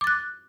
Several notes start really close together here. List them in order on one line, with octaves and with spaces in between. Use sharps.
D6 A6 F#6